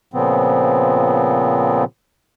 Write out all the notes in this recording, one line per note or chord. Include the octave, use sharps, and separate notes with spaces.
A#2 C#3 F3 B3 C4